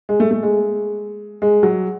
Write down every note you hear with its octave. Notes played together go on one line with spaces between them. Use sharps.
G#3
A3
A3
G#3
G#3
F#3